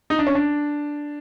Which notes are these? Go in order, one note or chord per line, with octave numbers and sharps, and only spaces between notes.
D#4
D4
C#4
D4